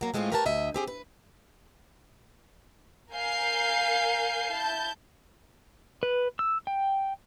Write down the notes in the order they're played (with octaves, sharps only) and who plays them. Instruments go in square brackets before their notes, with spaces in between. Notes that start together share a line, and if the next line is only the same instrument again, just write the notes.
[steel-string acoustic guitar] F#3 A#3
A2 G#3 A3 C4 F4
G4 A#4 B4 C#5 F#5 A5
D2 D#5 E5
C4 G4 G#4
B4
[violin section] A#4 F5 G#5 G6 C7
E4 A5 G6
[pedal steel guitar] B4
E6
G5